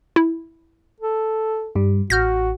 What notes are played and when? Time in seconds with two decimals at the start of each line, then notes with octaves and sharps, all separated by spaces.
0.16 E4
1.00 A4
1.75 G2 G3
2.10 A1 F#4 F6 G6 A#6